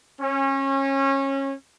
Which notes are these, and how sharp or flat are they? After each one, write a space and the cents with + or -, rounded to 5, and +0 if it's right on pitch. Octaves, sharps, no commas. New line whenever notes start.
C#4 -25